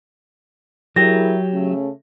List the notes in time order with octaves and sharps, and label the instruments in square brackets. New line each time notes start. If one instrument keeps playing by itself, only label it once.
[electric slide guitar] F#3 G4 [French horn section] E4 G#4 A#4 [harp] A#6
[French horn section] C#3 A3 C#4